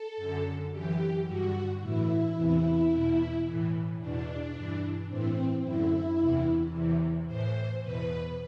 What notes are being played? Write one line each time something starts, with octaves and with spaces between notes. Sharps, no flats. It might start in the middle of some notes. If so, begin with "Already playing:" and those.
Already playing: A4
F#2 D3
F#2 E3 G4
G2 D3 F#4
A2 E3 E4
E2 C3 E3
E2 B2
A2 E3
E2 B2 D4
G2 E3
A2 E3 C4
F#2 D3 E4
E2 C3 E3
E2 C3 E3
A2 E3 C5
E2 B2 B4